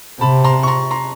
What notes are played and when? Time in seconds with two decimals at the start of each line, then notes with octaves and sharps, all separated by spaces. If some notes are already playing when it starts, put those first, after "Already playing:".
0.21 C3 A5 B5
0.44 A#5 C6
0.63 C#6
0.67 A#5 C6
0.91 A#5 C6